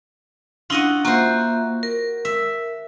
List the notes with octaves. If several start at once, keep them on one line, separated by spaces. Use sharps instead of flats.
C#4 D4 E4 F4 D#5 F#5
A#3 F4 F#4 C5 E5
A#4
E5